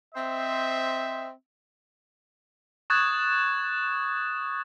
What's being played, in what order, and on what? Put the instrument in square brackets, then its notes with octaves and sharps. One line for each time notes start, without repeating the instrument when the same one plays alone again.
[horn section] C4 C5 D#5 E5
[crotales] C#6 D#6 F#6 G#6 A6 E7